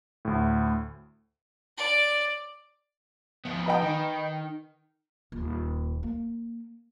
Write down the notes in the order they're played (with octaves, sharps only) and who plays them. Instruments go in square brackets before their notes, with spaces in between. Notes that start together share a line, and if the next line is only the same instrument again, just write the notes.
[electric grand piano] D2 A2
[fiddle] D5
[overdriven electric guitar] F3 B3
[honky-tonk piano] B4 D#5 G5
[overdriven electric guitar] D#3
[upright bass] D#1
A#3